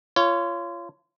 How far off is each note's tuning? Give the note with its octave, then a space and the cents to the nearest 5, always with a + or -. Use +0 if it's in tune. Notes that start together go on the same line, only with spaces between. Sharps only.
F4 -25 C#5 +5